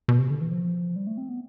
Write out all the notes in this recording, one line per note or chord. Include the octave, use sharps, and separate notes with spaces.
B2
C3
D3
E3
F3
G3
A3
C4
B3